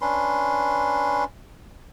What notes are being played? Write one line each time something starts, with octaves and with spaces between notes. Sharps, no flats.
C#4 D4 B4 C6